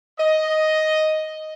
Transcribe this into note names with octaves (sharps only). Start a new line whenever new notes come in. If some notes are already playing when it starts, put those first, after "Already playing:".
D#5